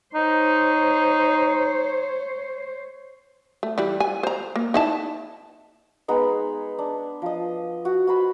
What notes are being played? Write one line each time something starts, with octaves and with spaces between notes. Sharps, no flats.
D#4 C5 C#5
A3
E3 G3
G#5
C5 A#5
A#3
D#4 E4 A5
G#3 B3 D#4
D4
F3 D#5
F#4
F#4 C5 B5